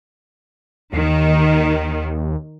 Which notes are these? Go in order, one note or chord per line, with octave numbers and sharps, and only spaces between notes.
D#2 D#3